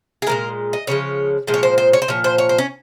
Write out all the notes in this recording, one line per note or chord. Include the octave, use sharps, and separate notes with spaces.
G#4
A#2 F3 G#3 A#4
D#5
C#3 F3 G#3 C#5
A#2 F3 G#3
C#5
C5
C5
C#5
C5
A#2 F3 C#5
C5
C#5
C5
C#4